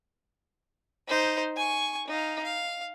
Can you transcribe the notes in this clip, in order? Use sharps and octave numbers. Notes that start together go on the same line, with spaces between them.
D#4 C5
G#5 C#6
D#4 F5
F5